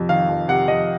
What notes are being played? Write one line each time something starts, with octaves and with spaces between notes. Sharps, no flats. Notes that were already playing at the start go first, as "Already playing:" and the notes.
Already playing: F2 C3
D#3 F5
F2
C3 F#5
F2 D#5